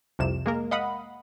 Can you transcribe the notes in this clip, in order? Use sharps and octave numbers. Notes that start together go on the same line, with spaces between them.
C2 F2 C3 E7
G#3 A#3 A#4
D#5 F5 F#5 B5 D#6